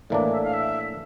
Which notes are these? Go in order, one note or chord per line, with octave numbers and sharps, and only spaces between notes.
A2 E3 A#3 D4 D5
E5
F5
E5